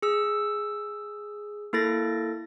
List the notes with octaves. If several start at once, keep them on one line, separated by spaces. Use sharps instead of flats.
G#4 E6
A#3 E4 A4 A6 A#6